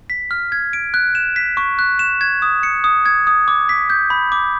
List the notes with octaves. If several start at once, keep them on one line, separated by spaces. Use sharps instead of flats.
B6
F6
G#6
D7
F#6
E7
B6
C#6
F#6
E7
G#6
D#6
C#7
D#6
G#6
D#6
D6
B6
G6
B5
D6